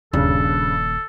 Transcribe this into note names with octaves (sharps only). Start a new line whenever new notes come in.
D#1 G2 C#3 A4